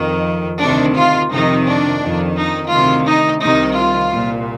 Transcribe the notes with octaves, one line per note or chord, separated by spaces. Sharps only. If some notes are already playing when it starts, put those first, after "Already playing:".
Already playing: F2 D#3
D2 C3 D#3 D4
F4
F2 C3 D#3 D#4
D4
F2 D#3
D#4
D2 C3 D#3 F4
D#4
C2 C3 D#3 D#4
F4
C2 A#2